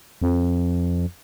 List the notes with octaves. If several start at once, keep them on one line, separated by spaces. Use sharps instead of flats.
F2